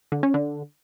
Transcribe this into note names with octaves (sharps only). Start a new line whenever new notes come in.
D3
C#4
D3